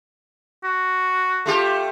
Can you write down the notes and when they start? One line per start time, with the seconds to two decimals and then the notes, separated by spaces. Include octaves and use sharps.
0.64 F#4
1.46 A3 F4 G4